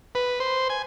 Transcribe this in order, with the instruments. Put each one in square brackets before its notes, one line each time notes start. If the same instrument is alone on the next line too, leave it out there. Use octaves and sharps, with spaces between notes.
[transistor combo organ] B4
C5
G#5